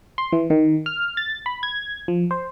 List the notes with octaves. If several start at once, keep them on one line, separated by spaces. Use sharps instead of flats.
C6
E3
D#3
F6
A6
B5
G#6
F3
C5